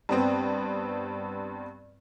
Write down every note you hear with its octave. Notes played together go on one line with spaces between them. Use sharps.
G2 B3 C4